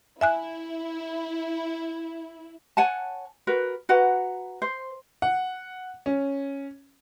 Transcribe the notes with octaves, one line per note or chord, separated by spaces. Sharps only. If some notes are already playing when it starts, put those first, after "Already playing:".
E4 E5 G#5 F#6
C#5 F#5 G#5 A5
F#4 A#4 B4
F#4 B4 F#5 A#5
C5
F#5
C#4